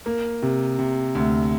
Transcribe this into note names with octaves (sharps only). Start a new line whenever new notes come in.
A#3
C3
C3
D2